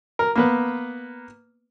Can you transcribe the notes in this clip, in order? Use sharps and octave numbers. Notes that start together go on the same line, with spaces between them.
A#4
A#3 B3 B4